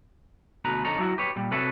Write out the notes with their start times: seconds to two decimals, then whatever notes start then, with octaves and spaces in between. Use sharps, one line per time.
0.65 D2 B2 B4 A#5
0.85 F2 D3 D#4 A4 C#5 A#5
0.98 F#3 E4 F#4
1.18 G4 B4 C#5
1.36 A#2 G3
1.51 C3 F#4 A4 B4 C#5 E5